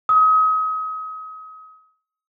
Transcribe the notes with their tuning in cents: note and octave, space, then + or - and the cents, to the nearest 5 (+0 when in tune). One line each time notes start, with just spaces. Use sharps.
D#6 +35